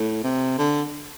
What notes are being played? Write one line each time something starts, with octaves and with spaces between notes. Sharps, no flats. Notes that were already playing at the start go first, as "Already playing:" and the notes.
Already playing: A2
C3
D3